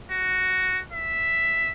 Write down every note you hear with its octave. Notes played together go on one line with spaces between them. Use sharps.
F#4
E5